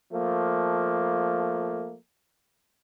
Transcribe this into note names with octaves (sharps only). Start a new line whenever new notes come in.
F3 A3 A#3